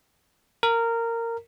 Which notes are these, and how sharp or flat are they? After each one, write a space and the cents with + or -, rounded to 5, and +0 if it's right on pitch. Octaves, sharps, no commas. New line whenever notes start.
A#4 -15